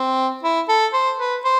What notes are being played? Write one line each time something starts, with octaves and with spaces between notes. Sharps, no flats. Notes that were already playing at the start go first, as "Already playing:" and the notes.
Already playing: C4
E4
A4
C5
B4
C5